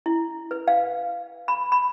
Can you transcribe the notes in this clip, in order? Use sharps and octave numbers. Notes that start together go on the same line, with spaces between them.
E4
B4
F5
B5
B5